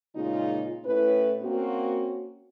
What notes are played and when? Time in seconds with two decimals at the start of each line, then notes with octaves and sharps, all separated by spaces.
0.15 A#2 C#3 G#3 D#4 F4
0.84 A2 C#4 E4 B4
1.41 A#3 C4 C#4 F#4